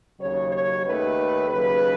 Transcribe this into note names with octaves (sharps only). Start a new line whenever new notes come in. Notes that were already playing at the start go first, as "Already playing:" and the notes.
D#2 C#3 F#3 C#5
C#5
D#2 D#3 A3 B4
D#2 C#3 F#3 B4